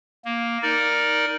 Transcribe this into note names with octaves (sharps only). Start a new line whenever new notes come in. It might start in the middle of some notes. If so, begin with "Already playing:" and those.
A#3
D#4 A#4 D5